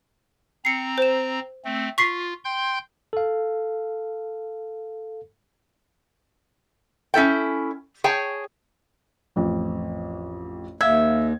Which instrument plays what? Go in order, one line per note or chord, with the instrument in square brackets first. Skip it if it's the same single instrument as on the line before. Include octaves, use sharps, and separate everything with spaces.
[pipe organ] C4 A#5 [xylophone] C7 C#7
[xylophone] C5 E7
[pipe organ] A3 C4
[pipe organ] F4 [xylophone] C#6 B6 C7
[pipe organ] G5 C6 G6
[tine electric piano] A4 F5
[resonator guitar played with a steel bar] C#4 E4 A4 G5
G#4 C#5 G5 A5
[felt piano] A1 F2
[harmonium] D#2 [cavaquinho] E5 [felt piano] F5 G#6